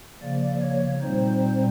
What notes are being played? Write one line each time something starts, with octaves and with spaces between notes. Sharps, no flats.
C#3 F3 A#3 D5
C#5
A#2 G3 C4 D#4 C5